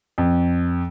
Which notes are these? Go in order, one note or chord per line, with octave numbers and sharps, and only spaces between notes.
F2